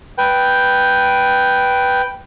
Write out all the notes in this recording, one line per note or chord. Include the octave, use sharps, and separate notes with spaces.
B4 G5